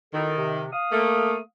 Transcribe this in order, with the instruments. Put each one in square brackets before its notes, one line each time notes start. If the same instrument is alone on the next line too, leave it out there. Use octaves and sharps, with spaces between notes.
[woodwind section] B2 E4 A4 [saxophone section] D#3
[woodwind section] C3
F5 D#6
[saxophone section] A3 A#3